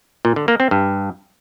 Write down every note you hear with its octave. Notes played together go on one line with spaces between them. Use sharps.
A#2
D3
A#3
C4
G2